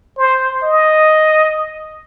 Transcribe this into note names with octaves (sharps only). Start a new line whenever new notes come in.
C5
D#5